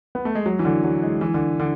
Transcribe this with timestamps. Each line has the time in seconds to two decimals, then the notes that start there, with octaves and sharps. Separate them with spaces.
0.15 B3
0.25 A3
0.35 G#3
0.46 F#3
0.59 E3
0.65 D3
0.84 F#3
1.03 G#3
1.21 E3
1.34 D3
1.60 D3